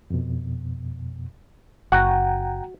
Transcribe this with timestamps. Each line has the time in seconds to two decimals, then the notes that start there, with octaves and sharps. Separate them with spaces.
0.10 F2 B2
1.92 F#1 F#4 F#5 G5 A#5